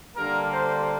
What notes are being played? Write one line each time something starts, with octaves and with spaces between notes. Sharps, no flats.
D3 G3 A#3 A#4
C5